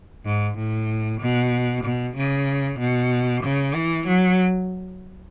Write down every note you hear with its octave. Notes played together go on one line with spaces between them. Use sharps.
G#2
A2
B2
B2
C#3
B2
C#3
E3
F#3